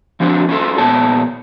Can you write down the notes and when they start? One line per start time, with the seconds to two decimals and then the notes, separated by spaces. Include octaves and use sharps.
0.20 F3 F#3 C4 D4
0.49 C#4 F4 A4
0.78 A#2 B3 C#5 A5